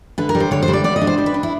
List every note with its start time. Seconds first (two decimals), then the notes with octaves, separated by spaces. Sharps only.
0.18 D3 B4
0.29 A#4
0.35 G3
0.40 C5
0.51 D3 C#5
0.63 C5
0.68 G3
0.73 D5
0.84 B3 D5
0.96 D#5
1.02 D4
1.07 C5
1.18 G3 C5
1.26 B4
1.34 D4
1.43 E4